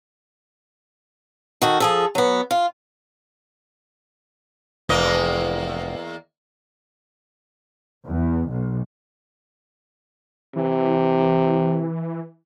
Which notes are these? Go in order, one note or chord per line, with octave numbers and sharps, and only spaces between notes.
D#3 F#4 A4
F3 G#4 A4
F#3 B3
F4
F1 E2 A#3 D#5
E2
B1
C3 E3